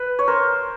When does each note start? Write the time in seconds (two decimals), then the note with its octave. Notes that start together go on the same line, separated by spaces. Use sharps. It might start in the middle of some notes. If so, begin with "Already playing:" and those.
Already playing: B4
0.19 C#5
0.28 A#4 C5